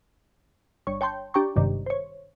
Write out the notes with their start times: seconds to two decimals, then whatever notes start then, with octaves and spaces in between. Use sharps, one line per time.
0.87 G1 C#5 C#6
1.01 C#5 G5 A5 C6 G6
1.34 D4 G4 G5 A#5 C#6
1.56 G#1 G2 C3 D#3
1.86 C5 C#5